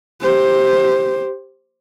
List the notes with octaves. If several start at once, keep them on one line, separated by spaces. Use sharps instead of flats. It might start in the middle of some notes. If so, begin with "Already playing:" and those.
G4 C5